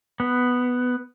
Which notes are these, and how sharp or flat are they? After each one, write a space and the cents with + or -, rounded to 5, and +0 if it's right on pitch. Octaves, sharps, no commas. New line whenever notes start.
B3 +5